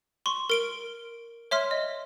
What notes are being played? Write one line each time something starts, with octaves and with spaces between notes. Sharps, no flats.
C6 C#6
A#4 D7 G7
C#5 E5 C6 F6
D#5